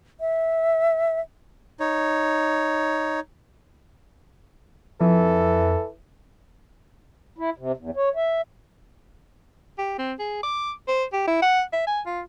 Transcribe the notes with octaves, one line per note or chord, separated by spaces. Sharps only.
E5
D#4 C#5
F2 E3 A4
E4
C3
E2
C#5
E5
G4
C4
G#4
D6
C5
G4
E4
F#5
E5
G#5
F4